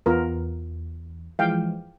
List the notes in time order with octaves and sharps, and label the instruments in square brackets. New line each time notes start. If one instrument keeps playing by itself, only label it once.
[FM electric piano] E2 [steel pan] B3 F4 A#4
[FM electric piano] E3 F3 G#3 [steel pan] F5 G5